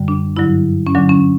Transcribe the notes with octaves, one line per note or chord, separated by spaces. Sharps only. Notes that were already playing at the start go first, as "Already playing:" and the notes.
Already playing: F#2 D3 G3
D4
G2 D3 F#3 E4
C#4
E2 D3 F#3 D4
C#4